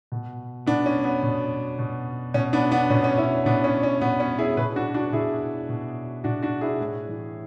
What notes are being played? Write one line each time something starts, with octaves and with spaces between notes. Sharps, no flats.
B2
B2 B3 D4
C#4
B3
B2
B2
B2 C#4
B3 D4
B3 D4
B2 C#4
C#4
C#4 E4
B2 B3 D4
C#4
C#4
B2 B3
C#4
E4 G#4
B2 G#4 B4
D4 F#4
D4 F#4
B2 E4 G#4
B2
B2 D4 F#4
D4 F#4
E4 G#4
A2
E3